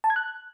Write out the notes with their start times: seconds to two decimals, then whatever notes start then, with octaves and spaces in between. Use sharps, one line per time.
0.04 A5
0.10 G#6
0.16 F#6